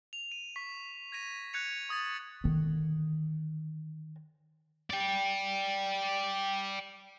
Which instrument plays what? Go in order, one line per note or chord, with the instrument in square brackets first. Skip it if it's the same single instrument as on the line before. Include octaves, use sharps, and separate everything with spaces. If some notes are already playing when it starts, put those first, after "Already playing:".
[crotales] F7
D#7
C#6 B6
G#6 A#6 D#7
F#6 G#6 C#7 F7
C#6 D#6 G#6 A6
[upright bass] D3 D#3
[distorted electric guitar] D5 G5